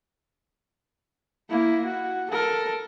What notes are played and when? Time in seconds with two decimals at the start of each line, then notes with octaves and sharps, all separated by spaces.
1.50 A#3 E4
1.86 F#4
2.31 A4 A#4